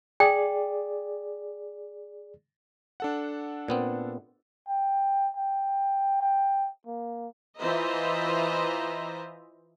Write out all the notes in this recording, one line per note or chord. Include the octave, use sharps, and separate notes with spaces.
G#4 D5 G5
D4 A4 F#5
A#2 B3 C4
G5
G5
G5
A#3
E3 F4 C5 D#5 E5 A#5